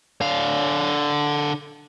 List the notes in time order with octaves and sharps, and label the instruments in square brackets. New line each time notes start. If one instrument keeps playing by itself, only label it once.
[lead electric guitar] D3 F5